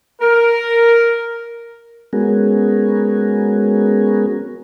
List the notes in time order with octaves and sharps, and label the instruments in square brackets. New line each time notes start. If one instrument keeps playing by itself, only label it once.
[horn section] A#4
[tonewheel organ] G#3 B3 C#4 F#4 G#4 A#4